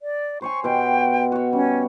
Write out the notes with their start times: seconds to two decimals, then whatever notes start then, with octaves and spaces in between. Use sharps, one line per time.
0.01 D5
0.42 C5 C#5 G#5 C#6
0.64 B2 G4 G5 C6
1.32 F#4 C#5
1.53 G3 C#4